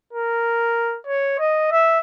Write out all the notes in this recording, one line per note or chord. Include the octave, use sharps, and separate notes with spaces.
A#4
C#5
D#5
E5